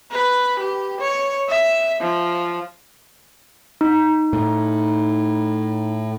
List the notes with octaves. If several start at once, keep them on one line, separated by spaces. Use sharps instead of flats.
B4
G4
C#5
E5
F3
D#4
A2